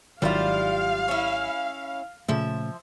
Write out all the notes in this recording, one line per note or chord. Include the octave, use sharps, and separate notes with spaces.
G#1 D#3 F#3 G3 E4 F4 F5
C#4 E4
A#2 C#3 F3 A3 E5